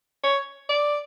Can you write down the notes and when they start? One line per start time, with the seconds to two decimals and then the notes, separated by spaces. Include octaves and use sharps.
0.24 C#5
0.69 D5